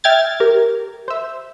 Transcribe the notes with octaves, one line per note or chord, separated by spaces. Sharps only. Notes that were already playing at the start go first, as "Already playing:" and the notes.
E5 G5 F6 G#6 A6
G4 A#4
C5 E5